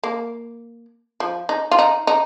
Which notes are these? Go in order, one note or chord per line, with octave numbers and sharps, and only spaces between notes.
A#3
F3
D#4
F4
D#4
D#4